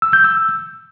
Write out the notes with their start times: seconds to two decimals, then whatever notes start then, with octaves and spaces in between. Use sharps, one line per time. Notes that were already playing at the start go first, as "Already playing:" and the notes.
0.02 E6
0.13 G6
0.24 E6